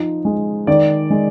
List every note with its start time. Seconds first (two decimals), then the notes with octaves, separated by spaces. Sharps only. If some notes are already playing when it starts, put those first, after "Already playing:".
Already playing: F3 D#4
0.25 G#3
0.67 D#3 D5
1.10 G#3